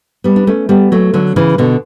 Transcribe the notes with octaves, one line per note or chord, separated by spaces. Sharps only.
G3 B3
D4
A3 C#4
G3 B3
F#3 A3
D3 F#3
C#3 E3
B2 D3